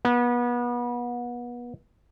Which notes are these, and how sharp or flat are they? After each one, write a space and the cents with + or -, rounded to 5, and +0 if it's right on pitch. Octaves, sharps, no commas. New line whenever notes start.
B3 -30